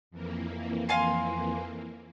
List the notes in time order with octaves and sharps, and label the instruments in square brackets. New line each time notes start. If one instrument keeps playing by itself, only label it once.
[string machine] F2 E3 A#3
[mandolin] F5 G#5 C6